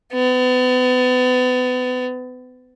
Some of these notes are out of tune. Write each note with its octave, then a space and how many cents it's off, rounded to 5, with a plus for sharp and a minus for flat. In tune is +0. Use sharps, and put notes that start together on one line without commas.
B3 +35